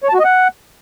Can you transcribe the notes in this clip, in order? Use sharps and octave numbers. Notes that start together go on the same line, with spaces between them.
C#5
A5
F#4
D#5
F#5